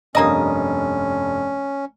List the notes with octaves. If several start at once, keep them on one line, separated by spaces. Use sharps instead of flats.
F1 G2 A#3 C#4 D#5 A#5 D#6